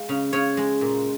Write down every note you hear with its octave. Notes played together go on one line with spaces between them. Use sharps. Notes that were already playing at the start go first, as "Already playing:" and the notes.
Already playing: G#3 F5
C#3
C#3 C#5
G#3
A#2